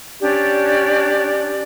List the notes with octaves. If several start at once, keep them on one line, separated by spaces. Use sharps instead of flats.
C#4 D4 G4 D5